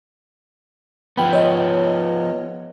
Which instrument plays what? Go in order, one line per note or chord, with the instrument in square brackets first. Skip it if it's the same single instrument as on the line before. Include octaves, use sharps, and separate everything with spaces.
[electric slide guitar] F3 B3 [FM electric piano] G5 B5
[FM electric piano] C#5 D#5